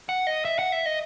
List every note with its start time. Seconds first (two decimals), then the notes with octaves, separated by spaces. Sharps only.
0.09 F#5
0.27 D#5
0.45 E5
0.59 F#5
0.72 E5
0.86 D#5